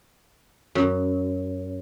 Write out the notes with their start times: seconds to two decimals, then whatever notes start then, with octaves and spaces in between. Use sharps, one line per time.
0.75 F#2